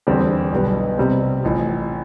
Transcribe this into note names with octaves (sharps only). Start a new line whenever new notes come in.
E2 D3 G3 C4 G4
B1 B2 G3 B3
C3 G3 C4
A1 A2 F3